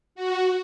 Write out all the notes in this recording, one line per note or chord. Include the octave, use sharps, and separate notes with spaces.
F#4